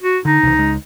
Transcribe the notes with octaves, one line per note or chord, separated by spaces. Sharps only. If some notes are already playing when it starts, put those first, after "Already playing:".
F#4
D3 D#4
C2 C#3 E3
C#2 G#3